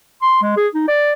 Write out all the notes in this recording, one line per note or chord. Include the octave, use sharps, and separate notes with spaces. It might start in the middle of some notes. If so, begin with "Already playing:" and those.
C6
G#3
G#4
D#4
D5